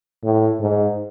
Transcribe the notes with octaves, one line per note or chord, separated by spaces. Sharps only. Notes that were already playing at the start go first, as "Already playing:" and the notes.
A2
G#2